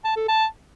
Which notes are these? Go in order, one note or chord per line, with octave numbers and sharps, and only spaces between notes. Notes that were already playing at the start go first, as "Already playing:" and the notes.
A5
A4
A5